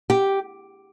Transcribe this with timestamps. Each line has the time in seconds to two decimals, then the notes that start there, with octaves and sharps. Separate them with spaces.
0.10 G4